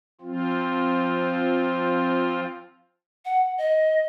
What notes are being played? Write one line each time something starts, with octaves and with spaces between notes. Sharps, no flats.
F3 C4 F4
F#5
D#5